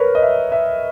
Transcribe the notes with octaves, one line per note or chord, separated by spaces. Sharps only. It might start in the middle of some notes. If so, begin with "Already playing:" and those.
Already playing: A#4 B4 C#5
D#5
E5
E5